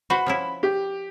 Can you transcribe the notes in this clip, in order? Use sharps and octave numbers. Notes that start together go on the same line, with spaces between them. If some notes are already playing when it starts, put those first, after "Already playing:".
F#4 B4 C5 B5
F3 C#4 E4
G4